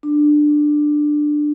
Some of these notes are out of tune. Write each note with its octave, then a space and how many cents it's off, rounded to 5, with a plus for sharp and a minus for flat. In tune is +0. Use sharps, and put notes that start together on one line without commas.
D4 +15